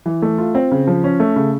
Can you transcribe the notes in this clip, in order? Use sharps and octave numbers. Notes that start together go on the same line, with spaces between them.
E3
A3
F4
C4
C#3
F3
C#4
A3
C#3